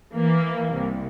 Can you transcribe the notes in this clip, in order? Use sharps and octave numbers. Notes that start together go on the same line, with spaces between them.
E3 A#3
C2